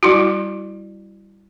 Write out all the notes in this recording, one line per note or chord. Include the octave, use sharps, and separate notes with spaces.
G3 E4 F#4